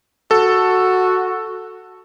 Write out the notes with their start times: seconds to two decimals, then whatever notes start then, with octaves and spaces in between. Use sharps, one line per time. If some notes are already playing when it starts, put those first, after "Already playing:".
0.31 F#4 A4